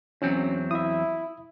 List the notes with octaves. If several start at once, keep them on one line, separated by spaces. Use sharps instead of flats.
E2 F#3 C4 C#4
E4 E5 D#6